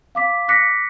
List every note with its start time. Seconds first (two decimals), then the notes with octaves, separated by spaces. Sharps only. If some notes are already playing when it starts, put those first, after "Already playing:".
0.15 F5 D6 B6
0.48 D6 F#6 A#6 B6 C#7